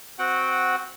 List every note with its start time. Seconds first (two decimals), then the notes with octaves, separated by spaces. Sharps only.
0.19 C4 F#4 F#5 G5